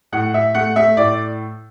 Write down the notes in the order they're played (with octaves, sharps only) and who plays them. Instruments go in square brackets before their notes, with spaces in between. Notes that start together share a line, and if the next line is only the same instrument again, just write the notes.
[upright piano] A2 F#5
A2 E5
A3 F#5
A3 E5
A2 D5